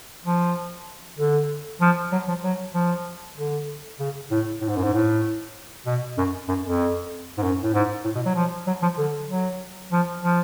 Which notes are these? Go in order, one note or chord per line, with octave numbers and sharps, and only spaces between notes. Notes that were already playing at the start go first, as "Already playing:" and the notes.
F3
D3
F3
F#3
F3
F#3
F3
D3
C#3
A2
A2
G#2
F#2
G#2
A2
B2
F#2
F#2
F2
G#2
F#2
A2
G#2
A2
B2
F#3
F3
F#3
F3
D3
F#3
F3
F3